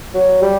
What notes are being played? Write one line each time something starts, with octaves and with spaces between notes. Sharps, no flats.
F#3
G3